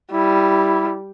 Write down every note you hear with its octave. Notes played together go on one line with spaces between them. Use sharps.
G3 E4